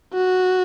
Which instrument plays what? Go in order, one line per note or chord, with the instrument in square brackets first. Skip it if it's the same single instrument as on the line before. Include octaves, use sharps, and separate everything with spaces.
[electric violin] F#4